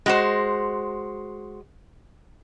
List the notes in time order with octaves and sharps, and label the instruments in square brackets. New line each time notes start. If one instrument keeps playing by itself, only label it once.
[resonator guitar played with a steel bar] G#3 F#4 C5